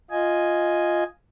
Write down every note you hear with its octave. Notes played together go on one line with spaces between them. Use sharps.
F4 D#5 G#5